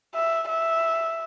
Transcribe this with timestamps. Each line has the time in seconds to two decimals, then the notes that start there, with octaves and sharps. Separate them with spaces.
0.15 E5
0.49 E5